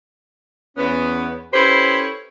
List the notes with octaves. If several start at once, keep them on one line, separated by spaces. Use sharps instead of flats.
E2 B3 C#4
C#4 E4 G4 A4 B4 C5